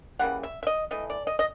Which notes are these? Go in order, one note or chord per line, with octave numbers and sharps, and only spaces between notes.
C#3 E3 G3 A#3 F#5
E5
E5
D#5
E3 A3 D#5
D5
D#5
D#5